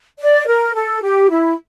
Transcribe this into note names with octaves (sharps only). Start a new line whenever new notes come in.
D5
A#4
A4
G4
E4